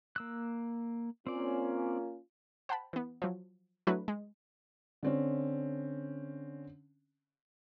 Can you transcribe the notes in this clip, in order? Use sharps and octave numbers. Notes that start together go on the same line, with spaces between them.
A#3 E6 F#6
A#3 C4 C#4 F4 D5
C5 F#5 G5 A5 B5
E3 B3
F3 F#3
F#3 A3 D4 E4 F#4 B4
G#3
D3 C4 C#4